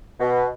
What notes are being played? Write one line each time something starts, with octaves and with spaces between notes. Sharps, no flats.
B2